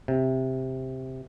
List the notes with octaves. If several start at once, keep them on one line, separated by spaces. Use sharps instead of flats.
C3